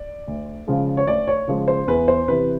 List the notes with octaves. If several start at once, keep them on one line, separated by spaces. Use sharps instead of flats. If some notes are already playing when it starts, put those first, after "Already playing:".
Already playing: D5
D2
C#3 F3 G#3
C#5
D2 D5
C#5
C#3 F3 G#3
C5
E2 B4
C5
C3 E3 B4